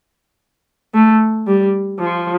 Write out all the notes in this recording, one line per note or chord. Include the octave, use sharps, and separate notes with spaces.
A3
G3
F3